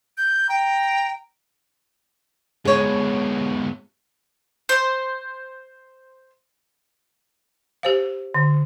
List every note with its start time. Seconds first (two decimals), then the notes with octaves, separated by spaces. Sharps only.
0.18 G6
0.49 G5 A#5
2.65 G#2 B2 G#4 C#5
4.69 C5 C6
7.83 G4 C5 F5
8.34 D3